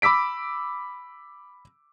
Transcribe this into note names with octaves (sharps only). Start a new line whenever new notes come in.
B5 D6 E6 B6 D7